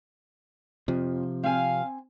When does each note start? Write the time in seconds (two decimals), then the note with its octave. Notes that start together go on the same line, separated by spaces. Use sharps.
0.88 F2 C3 F3
1.43 C4 F5 G#5